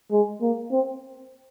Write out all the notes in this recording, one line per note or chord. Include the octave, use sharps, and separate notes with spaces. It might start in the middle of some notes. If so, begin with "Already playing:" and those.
G#3
A#3
C4